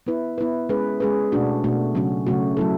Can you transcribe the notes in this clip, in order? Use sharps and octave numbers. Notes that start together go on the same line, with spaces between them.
B3 E4 B4
B3 E4 B4
G#3 C#4 G#4 B4
G#3 C#4 G#4 B4
B2 A3 D4 F#4
B2 A3 D4 F#4
C#3 F#3 A3 C#4 F#4
C#3 F#3 A3 C#4 F#4
F#3 A3 E4 A4